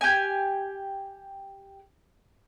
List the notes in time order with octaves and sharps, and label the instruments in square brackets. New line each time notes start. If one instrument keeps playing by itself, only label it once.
[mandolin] G4 G#5